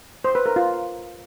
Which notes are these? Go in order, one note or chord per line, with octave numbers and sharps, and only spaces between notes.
C5
B4
A#4
F4